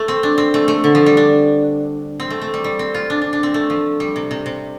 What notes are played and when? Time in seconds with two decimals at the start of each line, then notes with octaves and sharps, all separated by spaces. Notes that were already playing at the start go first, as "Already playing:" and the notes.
Already playing: A3
0.08 C4
0.23 D4
0.38 C4
0.54 A3
0.68 A3
0.84 D3
0.95 F3
1.06 G3
1.17 D4
2.20 C4
2.30 A3
2.42 A3
2.54 G3
2.64 G3
2.79 C4
2.94 F4
3.10 D4
3.22 D4
3.33 D4
3.43 C4
3.54 A3
3.70 F3
4.00 G3
4.16 C3
4.31 C3
4.46 C3